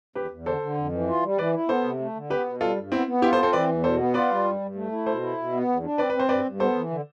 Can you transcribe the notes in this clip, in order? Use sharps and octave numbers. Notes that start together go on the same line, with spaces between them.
E2 G4 B4
E2
D3 A4 C5
D3
F2
E3
F4
G3
E3 B4 D5
E4
B3 A4 C5
C3
A3
D3
B3 G4 B4
B2
G3 F4 A4
G2
B3 C4 E4
B3
E4 F4 G4
A4 C5
C4
A4 C5
E3 B4 D5
E2
B2 A4 C5
B3
F4 B4 D5
G3
G2
G2
A3
E4
B2 A4 C5
E4
B2
B3
E2
D4
C4 B4 D5
C4 B4
C5
G2 B4 D5
G2
B3 A4 C5
E3
D3